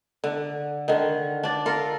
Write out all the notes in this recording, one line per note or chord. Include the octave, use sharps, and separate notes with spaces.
D3
D3 D#3
D4 D5
F4 A4 A#4